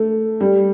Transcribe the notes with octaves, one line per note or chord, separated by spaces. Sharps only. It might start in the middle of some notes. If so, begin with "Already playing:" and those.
Already playing: A3
G3